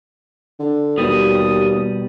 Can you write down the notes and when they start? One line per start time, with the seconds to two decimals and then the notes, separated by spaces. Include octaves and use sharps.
0.60 D3
0.98 D#2 B2 G3 D#6